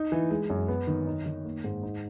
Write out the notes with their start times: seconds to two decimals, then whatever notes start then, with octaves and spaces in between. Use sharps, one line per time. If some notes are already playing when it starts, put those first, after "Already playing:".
Already playing: D#4
0.12 E3
0.31 G#3
0.50 F#2
0.68 B3
0.87 D#3
1.07 D#4
1.26 D#3
1.45 A#3
1.64 G#2
1.83 D#4